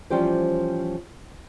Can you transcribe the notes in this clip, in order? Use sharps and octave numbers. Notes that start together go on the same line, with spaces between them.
E3 F3 G3 C#4 G4 C5